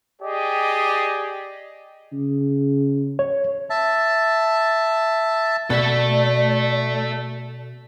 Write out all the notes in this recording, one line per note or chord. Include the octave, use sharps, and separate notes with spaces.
G4 G#4 D5 D#5
C#3
C#5
E5 A5
B2 A4 D5 E5